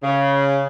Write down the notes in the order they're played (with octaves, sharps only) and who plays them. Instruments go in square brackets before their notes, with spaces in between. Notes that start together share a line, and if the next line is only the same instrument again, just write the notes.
[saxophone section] C#3